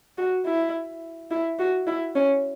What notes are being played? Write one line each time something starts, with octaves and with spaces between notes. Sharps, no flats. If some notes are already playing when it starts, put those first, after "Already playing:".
F#4
E4
E4
F#4
E4
C#4